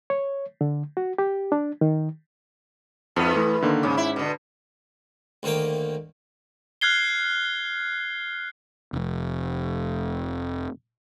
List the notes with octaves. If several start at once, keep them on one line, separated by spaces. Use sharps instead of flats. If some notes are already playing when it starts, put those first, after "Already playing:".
C#5
D3
F#4
G4
D4
D#3
F2 G#2 B3
E3 A3
D3 D#3 A#3
G#2 C#3 C#4 D6
E4
B2 D3
D2 D#3 A#3 F5 G5
F6 F#6 G#6 C7 G7
F1 F2